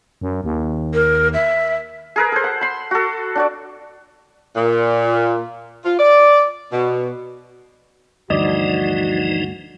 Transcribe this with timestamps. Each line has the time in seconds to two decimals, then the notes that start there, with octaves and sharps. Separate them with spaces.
0.21 F#2
0.44 D#2
0.94 A#4
1.34 E5
2.16 G#4 A#4 B4
2.32 A4 C5
2.44 F#5
2.61 B5 C6
2.91 F#4 A4
3.35 D4 F#4 D5
4.56 A#2
5.85 F4
5.99 D5
6.72 B2
8.30 D2 G2 E3 F3 D#4 F#4 D5 D#5